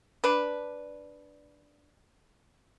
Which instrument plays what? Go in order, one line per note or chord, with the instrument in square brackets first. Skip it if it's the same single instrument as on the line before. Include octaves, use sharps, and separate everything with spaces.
[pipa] D4 B4